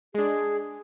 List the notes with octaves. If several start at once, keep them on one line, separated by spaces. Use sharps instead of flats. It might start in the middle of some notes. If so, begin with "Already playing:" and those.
G#3 D4 G#4